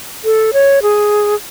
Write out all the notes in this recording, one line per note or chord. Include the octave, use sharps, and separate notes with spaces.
A4
C#5
G#4